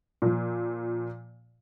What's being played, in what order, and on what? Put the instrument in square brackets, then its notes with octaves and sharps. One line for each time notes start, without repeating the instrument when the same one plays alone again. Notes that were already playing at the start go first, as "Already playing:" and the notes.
[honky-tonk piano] A#2 F3